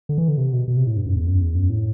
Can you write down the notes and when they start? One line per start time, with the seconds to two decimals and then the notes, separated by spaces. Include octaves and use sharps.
0.09 D3
0.18 E3
0.28 D3
0.38 C3
0.53 B2
0.68 B2
0.77 C3
0.87 A2
0.97 G2
1.06 F#2
1.16 E2
1.27 F#2
1.42 E2
1.55 F#2
1.70 A2